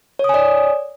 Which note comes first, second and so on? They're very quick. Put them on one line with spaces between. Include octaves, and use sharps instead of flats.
C#5 D#6 G#5 D5